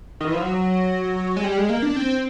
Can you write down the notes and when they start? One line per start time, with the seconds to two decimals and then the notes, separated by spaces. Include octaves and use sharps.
0.21 D#3
0.27 E3
0.34 F3
0.42 F#3
1.37 G#3
1.44 G3
1.58 G#3
1.70 A#3
1.82 D4
1.96 C4